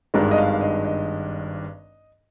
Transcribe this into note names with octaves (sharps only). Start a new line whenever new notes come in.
G#1 G2 D#3 G#3 D4 D5
D#5
F5
D#5
D#5